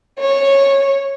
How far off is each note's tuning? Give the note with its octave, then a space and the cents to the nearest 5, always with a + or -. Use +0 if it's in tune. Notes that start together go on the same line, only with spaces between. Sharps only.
C#5 -10